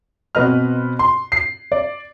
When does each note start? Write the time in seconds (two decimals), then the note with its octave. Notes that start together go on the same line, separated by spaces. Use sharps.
0.35 B2 C4 B4 D#5 F6
0.99 C6
1.32 C7
1.72 D5